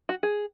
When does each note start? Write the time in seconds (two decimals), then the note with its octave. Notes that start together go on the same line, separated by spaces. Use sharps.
0.09 F#4
0.23 G#4